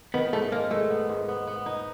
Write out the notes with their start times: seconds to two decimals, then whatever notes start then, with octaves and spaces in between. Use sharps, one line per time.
0.14 D#3 B3
0.33 G#2 A3
0.52 G#3 A#3
0.71 G#3 A3
0.90 B3
1.09 G#2
1.29 B3
1.48 B3
1.66 D#4